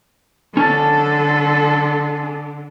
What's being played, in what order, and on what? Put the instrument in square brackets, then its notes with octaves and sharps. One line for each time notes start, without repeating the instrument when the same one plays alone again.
[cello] D3 [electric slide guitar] C#4 A5 [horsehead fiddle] A4